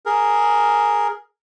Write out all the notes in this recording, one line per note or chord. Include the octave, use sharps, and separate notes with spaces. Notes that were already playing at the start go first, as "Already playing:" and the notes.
G#4 A#4